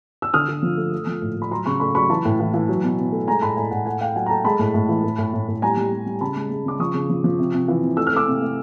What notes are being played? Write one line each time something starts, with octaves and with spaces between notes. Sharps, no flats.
E6
D3 D#6 F6
D3
F3
A3
A3
F3
A2
A2
B5
F#3 A#5 C6
C#3 B5 C#6
A3 B5 C#6
F#3 B5 C#6
E3 A5 B5
A2
E3
E3
F#3
B2
B2
A3
G#3 G#5 A#5
A2 A5 B5
A2 G#5 A#5
A2 F#5 G#5
A3 F#5 G#5
A3 F5 G5
F#3 F#5 G#5
A#5
A3 G5 A5
G#3 A5 B5
A2
A2
E3
A2
A2
A2
A2
G3 G#5 A#5
G3
G3
G3
C#3 A5 B5
G#3
G#3
C#3 D6
F3 C#6 D#6
C#3
F3
F3
C3
C3
E3
C3
A3 E6
F6
A3 D6 E6
C3
A3